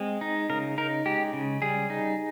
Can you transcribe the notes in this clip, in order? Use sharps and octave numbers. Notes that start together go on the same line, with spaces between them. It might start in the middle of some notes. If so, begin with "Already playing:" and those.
Already playing: G#3 C4
D#4
C#3 A#4
D#4 A#4
G#3 G4
C#3
G3 G#4
D#4